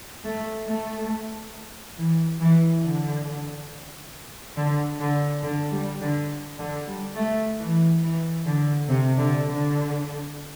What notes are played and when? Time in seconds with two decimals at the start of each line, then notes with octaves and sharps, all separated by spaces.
0.24 A3
0.67 A3
1.97 E3
2.40 E3
2.83 D3
4.56 D3
5.00 D3
5.43 D3
5.71 G3
6.01 D3
6.59 D3
6.87 G3
7.16 A3
7.59 E3
8.03 E3
8.46 D3
8.88 C3
9.17 D3
9.47 D3